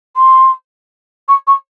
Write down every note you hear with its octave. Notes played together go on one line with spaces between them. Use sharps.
C6
C#6
C#6